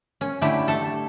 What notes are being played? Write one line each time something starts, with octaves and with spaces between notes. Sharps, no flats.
C#4
D3 A3 E4 G4
A3 A4